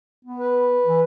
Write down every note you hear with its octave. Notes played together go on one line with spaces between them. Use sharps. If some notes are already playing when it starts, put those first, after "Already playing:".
B3
B4
E3